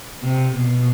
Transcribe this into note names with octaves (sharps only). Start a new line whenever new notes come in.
C3
B2